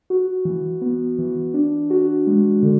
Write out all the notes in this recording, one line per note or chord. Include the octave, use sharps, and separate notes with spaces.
F#4
E3
B3
E3
D4
F#4
G#3
D3